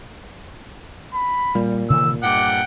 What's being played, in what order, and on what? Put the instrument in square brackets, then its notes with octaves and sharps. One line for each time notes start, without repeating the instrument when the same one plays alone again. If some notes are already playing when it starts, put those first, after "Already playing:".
[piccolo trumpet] B5
[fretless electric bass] A#2 [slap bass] G3
[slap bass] C3 D#3 E3 [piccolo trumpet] E6
[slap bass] G2 [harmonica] F#5 G5 [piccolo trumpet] D6